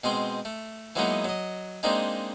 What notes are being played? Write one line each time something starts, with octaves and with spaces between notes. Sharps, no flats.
B2 G#3 C4 C5
A3
E3 F#3 G#3 A#3 B3 D#4
F#3 D#5
G#3 A#3 C4 D4 D#4